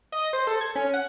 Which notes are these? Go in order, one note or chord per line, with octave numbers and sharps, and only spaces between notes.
D#5
C5
A4
G#6
C#4
F#5